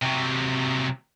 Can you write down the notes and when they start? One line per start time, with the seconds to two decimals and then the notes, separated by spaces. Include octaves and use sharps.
0.02 C3 F#3